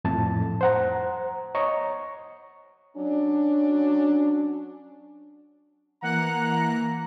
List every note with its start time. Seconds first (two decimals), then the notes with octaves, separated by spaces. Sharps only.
0.05 F2 A2 A5
0.61 C5 F#5 A#5
1.55 C#5 D#5 A#5 C#6
2.97 F#3 C#4 D4
6.02 E3 A#3 F#5 A#5 F#6